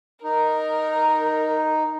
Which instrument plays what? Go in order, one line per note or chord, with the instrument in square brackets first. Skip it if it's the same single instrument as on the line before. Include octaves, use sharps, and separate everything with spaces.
[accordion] D#4 [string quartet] A#4